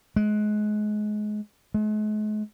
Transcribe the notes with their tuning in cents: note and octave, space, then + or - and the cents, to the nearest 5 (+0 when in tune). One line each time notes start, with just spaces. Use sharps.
G#3 +25
G#3 +45